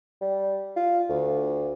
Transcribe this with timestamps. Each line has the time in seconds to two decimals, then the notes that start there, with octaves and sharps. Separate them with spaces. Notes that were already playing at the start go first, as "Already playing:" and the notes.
0.22 G3
0.76 F4
1.10 D2